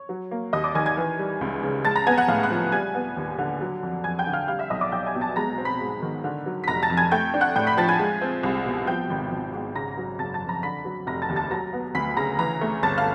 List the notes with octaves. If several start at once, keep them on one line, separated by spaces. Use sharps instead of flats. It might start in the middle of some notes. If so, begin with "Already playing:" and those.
Already playing: C#5
F#3
A#3
D#2 D#5 D#6
D5 D6
D#3 G#5 G#6
G#5 G#6
E3
G3
C#2
C#3
G#3 A5 A6
A#5 A#6
B3 G#5 G#6
F#5 F#6
A2 F5 F6
F#5 F#6
F3
G3 G#5 G#6
B3
D#2
D3
F#3
F2
F2 G#5 G#6
G5 G6
D3
F5 F6
G3 F5 F6
E5 E6
B1 D#5 D#6
D5 D6
B1 G5 G6
G#5 G#6
B2
A5 A6
G#3 A#5 A#6
C4
B5 B6
G#2
D#3
D3
F#3
B6
F1 A#5 A#6
A5 A6
F2
G#5 G#6
A3 G5 G6
D4
F#5 F#6
A2 G5 G6
B5 B6
F3 A5 A6
G#5 G#6
G#3
C4
C2
B2
F3 G5 G6
G#1
G#1
G#2
C#3 A#5 A#6
F#3
F#1 A5 A6
A5 A6
F2
A#5 A#6
D3 B5 B6
F#3
F1 A#5 A#6
A5 A6
D#2
A5 A6
F#3 A#5 A#6
B3
D2 B5 B6
C#3 A#5 A#6
E3 A#5 A#6
A3
G1 A5 A6
F5 F6